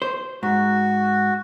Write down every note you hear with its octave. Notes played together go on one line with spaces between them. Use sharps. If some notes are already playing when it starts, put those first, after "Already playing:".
C5
G#2 F#4